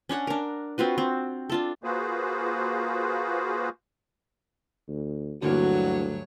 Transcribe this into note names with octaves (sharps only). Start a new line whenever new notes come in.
C#4 D4 C#5 F#5
D4 A#4
C4 F4 F#4 B4
C4
D4 F4 A4
A#3 F4 F#4 G#4 B4 C5
D2
D2 G2 D3 E3 F#3 A#3 F#4 C#5